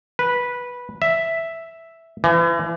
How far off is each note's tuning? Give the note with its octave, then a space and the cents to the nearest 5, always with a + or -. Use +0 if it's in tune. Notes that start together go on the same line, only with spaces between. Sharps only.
B4 -10
E5 +0
E3 +35